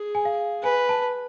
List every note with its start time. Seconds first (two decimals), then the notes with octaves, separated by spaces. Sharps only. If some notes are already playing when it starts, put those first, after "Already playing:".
Already playing: G#4
0.15 G#5
0.25 F5
0.63 B4 G#5
0.89 A5